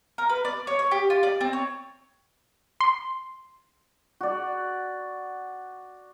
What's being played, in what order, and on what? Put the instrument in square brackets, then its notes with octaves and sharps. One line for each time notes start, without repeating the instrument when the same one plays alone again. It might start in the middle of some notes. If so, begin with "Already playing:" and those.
[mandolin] A#4
B4
D5
C#5
C#5
G4
F4
D5
C4
C#5
[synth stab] C6
[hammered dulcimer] F#4 D5